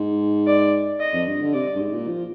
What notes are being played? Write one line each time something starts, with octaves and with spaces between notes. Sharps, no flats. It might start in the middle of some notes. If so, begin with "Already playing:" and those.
Already playing: G#2
D5
D#5
F2
G2
D3
C3 D5
G2
G#2
A#2
F3